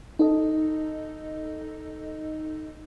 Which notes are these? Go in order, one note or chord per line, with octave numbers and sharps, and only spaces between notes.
D#4 A4 D#5